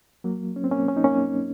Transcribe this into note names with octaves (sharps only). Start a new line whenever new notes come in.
F#3 A#3
C#4
C4
A#3 C#4
C#4
D#4
A#3 C#4